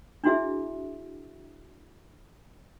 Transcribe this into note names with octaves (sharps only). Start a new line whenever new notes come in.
D4 E4 F#4 G#4 E5